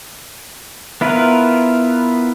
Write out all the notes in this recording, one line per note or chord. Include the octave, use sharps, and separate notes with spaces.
B3 E4 F4 A#4 B4